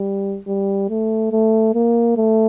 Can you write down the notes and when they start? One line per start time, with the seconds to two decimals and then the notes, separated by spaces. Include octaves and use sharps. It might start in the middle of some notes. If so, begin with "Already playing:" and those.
Already playing: G3
0.47 G3
0.89 A3
1.32 A3
1.74 A#3
2.17 A3